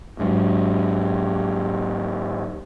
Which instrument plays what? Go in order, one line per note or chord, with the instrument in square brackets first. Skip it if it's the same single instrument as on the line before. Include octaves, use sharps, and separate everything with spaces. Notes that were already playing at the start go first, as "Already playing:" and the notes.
[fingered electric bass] G#2 F#3